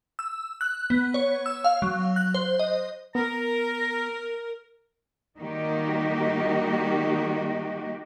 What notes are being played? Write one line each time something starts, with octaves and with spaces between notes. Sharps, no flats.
E6
F#6
B3
C#5
E6
F5
F#3
F#6
C5
D#5
B3 A#4 A#5
D#3 G3 A#3 D#4 F#4 G4